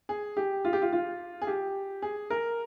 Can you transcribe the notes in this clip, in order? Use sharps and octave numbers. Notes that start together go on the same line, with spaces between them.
G#4
G4
F4
G4
F4
F4
G#4
G4
G#4
A#4